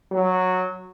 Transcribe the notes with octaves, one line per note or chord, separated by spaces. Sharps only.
F#3